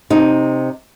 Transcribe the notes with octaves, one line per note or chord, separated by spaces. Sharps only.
C3 D#4